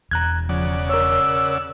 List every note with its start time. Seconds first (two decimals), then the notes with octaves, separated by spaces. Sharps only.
0.11 E1 E2 A#5 F#6 G#6
0.49 C#3 F3 D5 F#5
0.89 A#4 C#5 E6